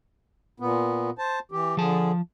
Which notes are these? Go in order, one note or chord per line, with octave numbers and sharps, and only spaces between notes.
A#2 B3
C5 A5
E3 G4
D3 F3 G#4 A5